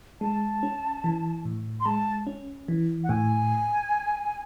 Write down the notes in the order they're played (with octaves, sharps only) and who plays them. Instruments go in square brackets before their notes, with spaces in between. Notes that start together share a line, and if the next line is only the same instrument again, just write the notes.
[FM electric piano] G#3 [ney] A5
[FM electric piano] C#4
E3
A2
[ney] C6
[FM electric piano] G#3 [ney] A5
[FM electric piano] C#4
E3
[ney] F#5
[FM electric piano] A2 [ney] G#5